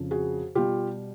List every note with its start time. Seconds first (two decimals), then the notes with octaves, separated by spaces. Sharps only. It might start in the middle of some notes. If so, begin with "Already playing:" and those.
Already playing: F2 C#3 F3
0.11 F#4 G#4
0.55 B2 G3 F4 G4